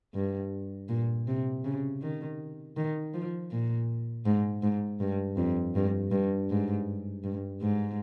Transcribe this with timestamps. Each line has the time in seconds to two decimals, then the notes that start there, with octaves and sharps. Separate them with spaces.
0.14 G2
0.89 A#2
1.27 C3
1.65 C#3
2.02 D#3
2.77 D#3
3.14 F3
3.51 A#2
4.26 G#2
4.62 G#2
5.00 G2
5.37 F2
5.75 G2
6.11 G2
6.50 G#2
7.24 G2
7.61 G#2